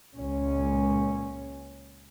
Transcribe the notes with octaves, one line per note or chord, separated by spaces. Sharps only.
C#2 A#2 C#4